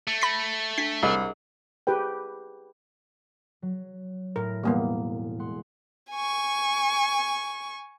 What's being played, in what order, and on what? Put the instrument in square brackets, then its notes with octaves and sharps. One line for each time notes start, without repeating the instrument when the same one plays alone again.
[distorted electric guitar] A3
[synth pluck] B5 A#6 B6
[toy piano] D4 [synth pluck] B6
[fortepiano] C2 [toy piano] G#4 A#4 D#5
[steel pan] G4 G#4 B4 G5
[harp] F#3
[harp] A2 [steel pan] A#4
[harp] E1 F6 [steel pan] G3 A#3 B3
[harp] G#3 F#5 C6
[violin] G#5 C#6